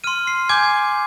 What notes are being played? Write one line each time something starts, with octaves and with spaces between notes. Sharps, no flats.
C6 F6 D#7
C7
G#5 D6 G6 G#6